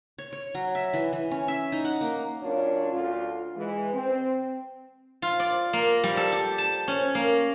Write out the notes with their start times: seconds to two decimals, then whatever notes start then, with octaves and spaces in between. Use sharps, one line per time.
0.19 C#5
0.33 C#5
0.55 F#3
0.75 E5
0.94 E3
1.13 E3
1.31 C#4
1.48 E5
1.72 D#4
1.85 F#5
2.01 A#3
2.41 F#2 A#2 C#4 D4 F4 C#5
2.91 D2 F4
3.56 E3 G#3 B4
3.94 C4
5.22 F4
5.40 D5
5.73 A#3
6.04 G3
6.17 A4
6.32 G4
6.58 A5
6.88 C#4
7.15 A#3